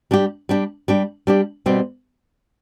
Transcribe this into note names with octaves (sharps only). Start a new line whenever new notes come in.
G3 D4 G4
G3 D4 G4
G3 D4 G4
G3 D4 G4
B2 G3 C4 G4